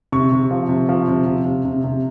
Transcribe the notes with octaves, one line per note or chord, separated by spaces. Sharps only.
C3 C#6
C3
F3
C3
F3
C3
C3
C3
C3
C3